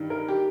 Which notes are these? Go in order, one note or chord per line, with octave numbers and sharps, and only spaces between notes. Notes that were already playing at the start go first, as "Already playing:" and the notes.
Already playing: G2 D#3 D#4
A#4
G4